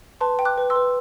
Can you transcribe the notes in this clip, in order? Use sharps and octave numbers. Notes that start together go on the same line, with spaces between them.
B4 A5 C6
G5
D6 F#6
B4
C6 E6
B4